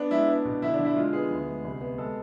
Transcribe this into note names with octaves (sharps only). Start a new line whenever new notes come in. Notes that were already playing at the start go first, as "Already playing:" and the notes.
Already playing: B3 D4
G#3 E4
B3 D4
B2
D3 E4
D4
D3
E4
G#3 F4
B3 G#4
D2
G#3
C2
B3
G#3 A4